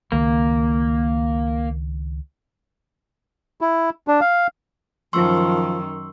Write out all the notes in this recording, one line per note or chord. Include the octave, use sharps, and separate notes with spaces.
C#2 D#3 A#3
E4
D4
F5
F#2 D#3 F3 C6 C#6 E6